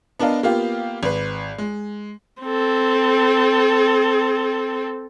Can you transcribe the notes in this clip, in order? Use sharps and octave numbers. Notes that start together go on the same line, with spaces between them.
B3 D4 A#4 D#5 F5
A#3 B3 F4 G4 F5
G#1 B4
G#3
C4 A4